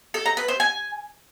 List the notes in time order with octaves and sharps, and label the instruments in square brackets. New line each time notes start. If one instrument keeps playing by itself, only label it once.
[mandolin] A4
A#5
B4
C5
G#5